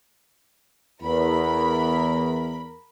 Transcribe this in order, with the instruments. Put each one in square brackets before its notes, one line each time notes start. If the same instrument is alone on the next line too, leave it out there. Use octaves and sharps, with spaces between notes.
[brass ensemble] E2 [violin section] A#4 B5